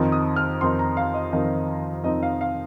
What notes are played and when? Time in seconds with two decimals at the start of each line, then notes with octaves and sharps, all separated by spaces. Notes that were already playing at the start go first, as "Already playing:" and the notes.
Already playing: F2 D#3 C4 D#4
0.12 D#6
0.36 F6
0.61 F2 D#3 C4 D#4 C6
0.79 A#5
0.97 F5
1.14 D#5
1.32 F2 D#3 C4 D#4
2.04 F2 D#3 C4 D#4 D#5
2.23 F5
2.41 F5